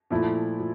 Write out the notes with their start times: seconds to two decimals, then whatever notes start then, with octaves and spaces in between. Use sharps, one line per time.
0.10 A#2 F3 A3 E4
0.59 F3